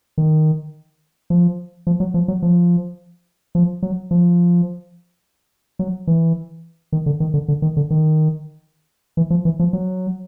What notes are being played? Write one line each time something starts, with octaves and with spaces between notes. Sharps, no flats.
D#3
F3
F3
F#3
F3
F#3
F3
F3
F#3
F3
F#3
E3
D#3
D3
D#3
D3
D3
D#3
D3
D#3
E3
F3
E3
F3
F#3